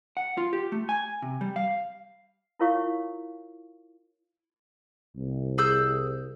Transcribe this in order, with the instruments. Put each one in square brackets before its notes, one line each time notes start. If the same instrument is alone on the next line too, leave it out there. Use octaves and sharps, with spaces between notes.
[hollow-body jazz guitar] F#5
F4
G4
A3
G#5
C3
G3
F5
[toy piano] E4 F4 A#4 C#5 F5 C#6
[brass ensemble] C2
[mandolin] G#4 E6 G6